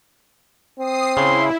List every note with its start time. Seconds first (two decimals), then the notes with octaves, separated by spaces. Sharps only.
0.79 C4 D#6 C7
1.17 C#3 E4 C6